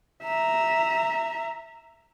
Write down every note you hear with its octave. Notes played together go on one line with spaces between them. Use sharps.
E5 A#5